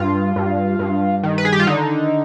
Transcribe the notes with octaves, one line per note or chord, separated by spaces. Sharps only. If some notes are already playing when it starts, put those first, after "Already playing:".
Already playing: G2 F4
G2
G2
D#3
B4
G#4
G4
F4
D3 D#4